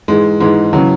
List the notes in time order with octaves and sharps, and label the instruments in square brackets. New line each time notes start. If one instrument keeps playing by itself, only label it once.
[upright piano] G#2 E3 G#3
G#2 E3 G#3
C#3 E3 F#3